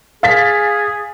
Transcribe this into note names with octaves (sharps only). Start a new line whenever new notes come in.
G#4 F5 A6 B6